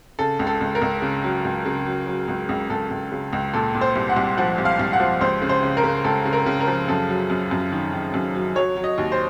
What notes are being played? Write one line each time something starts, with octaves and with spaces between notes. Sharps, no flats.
C#3 A4
C#2
A4
C#2
A#4
C#2
C#3
F#3
C#2
C#3
F#3
F#3
C#2
C#2
C#2 A4
C#2
C#3
C#2
A#2 A4
A#2
C5
C2
F#5
C2
F3 F#5
C2
F5
C2
F#5
F3
C#2 C5
C#3
C5
C#3
A#4
C#3
C#2 A4
C#3
A#4
C#3
A#4
F3
F#2 A4
F#3
F#2
F#2
D#3
D#3
F#2
F#3
F#3 C#5
F#3
D#5
D#2
C5